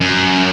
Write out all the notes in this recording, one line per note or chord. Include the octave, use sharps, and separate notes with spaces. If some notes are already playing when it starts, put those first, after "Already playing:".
F#2